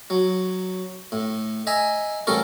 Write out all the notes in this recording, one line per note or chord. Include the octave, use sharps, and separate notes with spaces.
F#3
A2
D#5 E5 G#5 A#5
A1 G3 C#4 A4 A#4 C#6